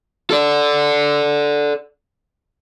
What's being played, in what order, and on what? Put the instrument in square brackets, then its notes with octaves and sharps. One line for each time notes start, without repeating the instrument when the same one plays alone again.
[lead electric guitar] A4 D5